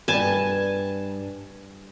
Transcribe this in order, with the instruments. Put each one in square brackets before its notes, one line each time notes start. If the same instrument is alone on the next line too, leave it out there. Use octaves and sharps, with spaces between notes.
[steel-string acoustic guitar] G2 [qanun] G#5 A5